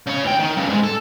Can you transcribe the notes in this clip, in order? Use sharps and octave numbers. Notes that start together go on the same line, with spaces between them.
C#3 C#5
D2 G5
D#3
G2 C#3
G#2 G#3
A4